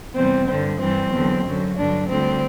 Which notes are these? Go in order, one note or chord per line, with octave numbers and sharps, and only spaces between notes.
E2 C3 G3 C4
G2 D3 G3
G2 E3 G3 C4
E2 D3 F#3
F#2 D3 F#3
G2 D3 F#3 D4
D2 D3 G3 C4